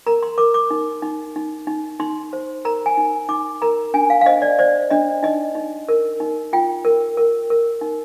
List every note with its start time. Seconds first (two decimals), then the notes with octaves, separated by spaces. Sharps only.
0.07 A#4 A#5
0.23 C6
0.38 A#4 D6
0.54 D6
0.70 D#4
1.02 D#4
1.36 D#4
1.67 D#4
2.00 D#4 C6
2.33 C5
2.65 A#4 A#5
2.86 G#5
2.97 D#4
3.29 D#4 D6
3.62 A#4 A#5
3.94 D4 G#5
4.10 F5
4.21 F5
4.26 C5 D#5
4.42 D5
4.59 C5 D5
4.91 D4 D#5
5.23 D#4 D#5
5.55 D#4
5.89 A#4
6.20 D#4
6.53 F4 G5
6.85 A#4
7.17 A#4
7.50 A#4
7.81 D#4